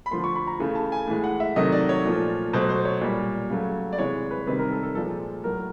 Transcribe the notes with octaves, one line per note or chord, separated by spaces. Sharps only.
B5
D3 F3 A3 C6
C#6
B5
A#5
C#3 E3 A3
A5
G#5
A2 E3 G#3
F#5
E5
C3 D#3 F#3 A3 D#5
D5
C#5
A#2 F3 A3
B2 F#3 A3 C5
C5
C#5
A#2 G3
C#3 F#3 A3
D5
C3 E3 G#3 C#5
B4
C3 D#3 G3 B4
A#4
A4
A4
A#2 F3 G#3 A4
A2 F#3 A3 A#4